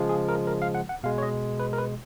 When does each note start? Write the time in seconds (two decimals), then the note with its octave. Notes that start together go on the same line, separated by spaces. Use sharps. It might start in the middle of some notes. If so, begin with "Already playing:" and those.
Already playing: C#3 F3 G#3
0.09 G#4
0.29 A#4
0.47 A#4
0.62 F5
0.75 F#5
0.89 F#5
1.03 B2 G#3 F5
1.18 C#5
1.23 D#5
1.60 B4
1.73 A#4
1.78 B4